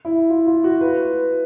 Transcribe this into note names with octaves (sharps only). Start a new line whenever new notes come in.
E4
F4
F4
F#4
B4